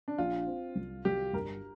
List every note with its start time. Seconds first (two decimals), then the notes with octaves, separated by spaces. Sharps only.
0.08 D4
0.18 A#1 F4
0.47 C4
0.75 C2
1.05 C2 G4
1.33 G1 A#4